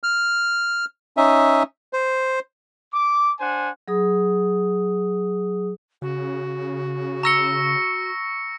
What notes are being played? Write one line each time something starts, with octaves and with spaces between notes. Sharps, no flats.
F6
C#4 D#4 E5
C5
D6
D4 C5 F#5 G#5
F#3 G#4 D#6
C#3 F#4
A#5 C#6 E6 A#6 C#7 G7